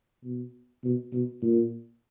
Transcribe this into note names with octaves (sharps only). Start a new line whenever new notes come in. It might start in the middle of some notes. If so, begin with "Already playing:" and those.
B2
B2
B2
A#2